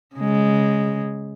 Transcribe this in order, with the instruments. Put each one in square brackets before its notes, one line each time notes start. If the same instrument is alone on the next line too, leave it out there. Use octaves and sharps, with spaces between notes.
[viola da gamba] C#3 G#3